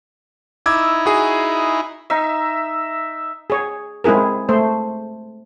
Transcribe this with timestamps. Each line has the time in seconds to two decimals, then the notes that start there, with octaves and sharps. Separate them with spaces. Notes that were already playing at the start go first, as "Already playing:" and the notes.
0.66 D#4 E4 D6 E6 G#6
1.06 F#4 G#4
2.10 D#4 E5
3.50 G#4 C#5
4.04 G#3 C4 E4 G#4 A#4
4.49 A3 C5